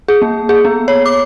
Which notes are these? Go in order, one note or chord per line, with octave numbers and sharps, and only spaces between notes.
G#4
A#3
G#4
B3
C#5
D6